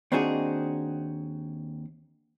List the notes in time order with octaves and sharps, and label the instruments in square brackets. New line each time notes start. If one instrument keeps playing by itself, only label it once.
[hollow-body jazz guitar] D#2 C4 D4 D#4 F#4 G#4